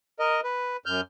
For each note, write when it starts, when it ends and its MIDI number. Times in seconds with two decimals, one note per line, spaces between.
0.20 0.41 70
0.20 0.41 75
0.44 0.77 71
0.86 1.01 42
0.86 1.01 89
0.86 1.01 91